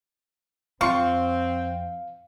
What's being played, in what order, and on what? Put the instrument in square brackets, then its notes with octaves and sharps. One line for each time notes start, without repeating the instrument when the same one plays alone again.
[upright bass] F2 [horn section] C4 [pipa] F4 C#6 [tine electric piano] F5